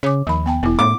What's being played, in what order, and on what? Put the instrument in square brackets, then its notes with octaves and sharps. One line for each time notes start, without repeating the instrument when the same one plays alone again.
[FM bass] C#3 [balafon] C#5 D6
[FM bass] D#2 [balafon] F3 B5
[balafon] B3 G5 A5
[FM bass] E1 [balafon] B3 E4
[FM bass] A2 [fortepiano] D6